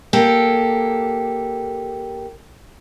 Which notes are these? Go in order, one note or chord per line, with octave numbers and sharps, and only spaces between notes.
A#3 G4 A4